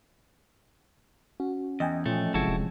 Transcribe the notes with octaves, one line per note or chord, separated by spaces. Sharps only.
C#4 F#4
E2 D#5 G5 G#5
A#2 E3 F3 A3 C#4
G1 C3 G#3 E4 F#4 A4
D#1